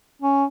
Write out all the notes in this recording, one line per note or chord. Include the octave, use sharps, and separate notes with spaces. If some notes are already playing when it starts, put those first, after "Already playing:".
C#4